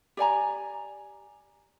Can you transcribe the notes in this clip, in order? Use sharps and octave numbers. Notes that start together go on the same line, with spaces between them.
G4 D5 G#5 A#5